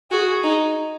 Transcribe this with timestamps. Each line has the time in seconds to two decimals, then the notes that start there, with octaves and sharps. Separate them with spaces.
0.11 F#4 G#4
0.44 D#4